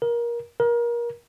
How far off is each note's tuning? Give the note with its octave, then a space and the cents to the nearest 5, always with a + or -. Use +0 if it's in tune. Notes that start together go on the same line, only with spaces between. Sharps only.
A#4 +20
A#4 +25